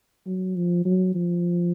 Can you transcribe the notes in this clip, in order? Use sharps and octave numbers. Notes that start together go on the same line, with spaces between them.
F#3
F3
F#3
F3